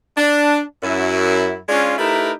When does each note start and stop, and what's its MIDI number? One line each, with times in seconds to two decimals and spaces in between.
0.18 0.62 62
0.83 1.59 42
0.83 1.59 64
1.69 1.98 56
1.69 1.98 61
1.69 1.98 62
1.69 1.98 65
1.98 2.32 57
1.98 2.32 63
1.98 2.32 64
1.98 2.32 67
1.98 2.32 70
1.98 2.32 71